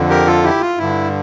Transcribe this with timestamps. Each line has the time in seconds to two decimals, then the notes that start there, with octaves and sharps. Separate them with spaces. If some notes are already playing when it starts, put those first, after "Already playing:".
Already playing: F2 D3
0.10 G4 A#4
0.27 F4 A4
0.44 E4 G4
0.61 F4
0.78 G2 D3 E4